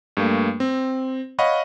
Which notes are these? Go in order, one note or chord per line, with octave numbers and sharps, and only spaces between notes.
G2 A3 A#3
C4
C#5 D#5 F5 F#5 B5 C#6